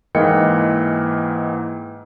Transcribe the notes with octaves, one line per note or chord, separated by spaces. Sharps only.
G#2 E3 A#3 D#5 G5 C#7